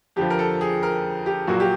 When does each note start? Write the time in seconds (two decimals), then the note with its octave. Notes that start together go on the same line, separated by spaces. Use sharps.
0.16 F2 D3 F3 G4
0.30 A#4
0.39 A4
0.61 G#4
0.83 A#4
1.26 G4
1.47 A#1 A#2 F#3 A#3 F#4
1.60 G4